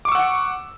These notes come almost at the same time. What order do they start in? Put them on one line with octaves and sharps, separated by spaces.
D6 C#6 E6 F#5